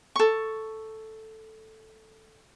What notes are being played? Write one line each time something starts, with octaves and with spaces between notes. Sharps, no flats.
A4 C#6